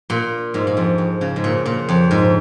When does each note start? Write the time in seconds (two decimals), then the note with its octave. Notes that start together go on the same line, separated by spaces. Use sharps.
0.10 A#2
0.54 G#2
0.67 G#2
0.77 F2
0.98 F2
1.21 C#3
1.36 G#2
1.44 A#2
1.66 A#2
1.89 F2
2.11 G#2